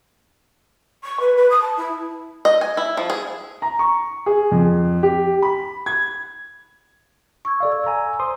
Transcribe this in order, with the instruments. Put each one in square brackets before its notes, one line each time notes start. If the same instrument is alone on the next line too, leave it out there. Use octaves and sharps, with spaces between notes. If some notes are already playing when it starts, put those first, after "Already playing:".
[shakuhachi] C#6
B4
B4
D#6
A5
E4
[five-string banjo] D#5
G#5
E4
F3
G#4
[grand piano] A#5
C#6
G#4
F2
G4
B5
G#6
[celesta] C#6 E6 G#6
[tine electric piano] A4 D5 F5
[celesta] E6
[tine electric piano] G#5 A#5
C5 C6 D#6